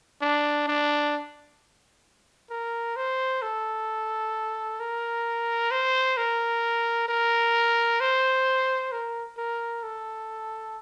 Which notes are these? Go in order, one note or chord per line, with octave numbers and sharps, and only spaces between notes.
D4
D4
A#4
C5
A4
A#4
C5
A#4
A#4
C5
A#4
A#4
A4